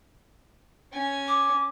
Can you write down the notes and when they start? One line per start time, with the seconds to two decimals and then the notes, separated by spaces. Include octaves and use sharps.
0.93 C#4 G#5
1.28 D6